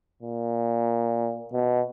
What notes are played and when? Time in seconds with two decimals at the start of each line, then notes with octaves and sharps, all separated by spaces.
0.22 A#2
1.53 B2